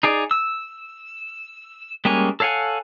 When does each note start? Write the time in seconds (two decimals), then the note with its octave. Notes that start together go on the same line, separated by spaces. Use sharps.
0.03 D#4 G#4 D5
0.31 E6
2.05 G3 G#3 A#3 C#4 G#5
2.40 A4 C#5 F5 F#5 G#5